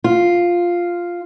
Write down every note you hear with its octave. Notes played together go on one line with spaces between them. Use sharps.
F4